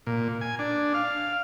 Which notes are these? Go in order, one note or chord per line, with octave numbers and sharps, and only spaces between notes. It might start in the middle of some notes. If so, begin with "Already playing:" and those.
A#2
G#5
D4
F5